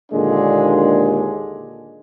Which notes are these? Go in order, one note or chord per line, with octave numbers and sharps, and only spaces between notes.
D#2 A#2 D3 G#3 D4